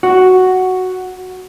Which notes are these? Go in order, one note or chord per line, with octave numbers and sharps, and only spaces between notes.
F#4